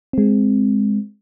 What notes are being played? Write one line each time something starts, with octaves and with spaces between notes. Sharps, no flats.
G#3 C4